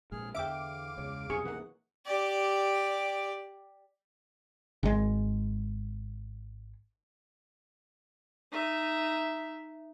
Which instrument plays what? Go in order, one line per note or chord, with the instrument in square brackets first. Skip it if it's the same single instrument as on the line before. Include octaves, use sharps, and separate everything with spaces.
[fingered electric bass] A#1 A#2 G#3 [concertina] G#4 F6
[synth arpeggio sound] E2 D6 D7 [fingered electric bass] D3 [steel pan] E5 G5 [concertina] F5
[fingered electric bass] C#2 [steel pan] C#5
[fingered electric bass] B1 F2 C3 [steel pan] G#4 C#6
[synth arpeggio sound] E3 A#3 [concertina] F#5
[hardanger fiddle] G4 D5
[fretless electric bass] G#1 G#3
[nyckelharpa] D#4 E5